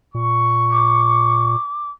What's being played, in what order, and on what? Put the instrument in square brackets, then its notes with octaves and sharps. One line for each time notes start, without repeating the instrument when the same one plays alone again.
[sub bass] A#2 [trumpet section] C#6
[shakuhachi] D6